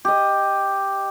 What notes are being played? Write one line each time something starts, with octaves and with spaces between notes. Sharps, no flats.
G4 D#5